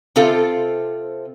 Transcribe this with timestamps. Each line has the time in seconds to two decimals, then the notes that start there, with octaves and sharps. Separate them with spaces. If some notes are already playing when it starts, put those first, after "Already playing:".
0.16 C3 C4 F4 A4